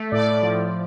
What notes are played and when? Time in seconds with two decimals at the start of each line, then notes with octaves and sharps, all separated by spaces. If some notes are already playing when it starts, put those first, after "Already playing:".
Already playing: A3
0.11 A2 D5
0.42 F3